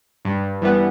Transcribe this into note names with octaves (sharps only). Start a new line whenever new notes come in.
G2
E3 G3 B3